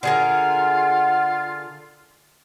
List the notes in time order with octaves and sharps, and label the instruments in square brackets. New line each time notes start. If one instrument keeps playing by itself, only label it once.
[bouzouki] D3 G#4 A#4 [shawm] F4 [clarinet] F#5